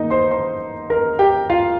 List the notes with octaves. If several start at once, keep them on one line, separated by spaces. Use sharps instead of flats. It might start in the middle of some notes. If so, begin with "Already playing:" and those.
Already playing: D#3 A#3 D#4 D#5
C5 C6
C5 C6
A#4 A#5
G4 G5
F4 F5